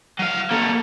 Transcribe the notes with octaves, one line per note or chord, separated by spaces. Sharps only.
F#3 F5
A#3 A4